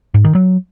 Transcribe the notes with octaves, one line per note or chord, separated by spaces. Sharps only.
G#2
D#3
F#3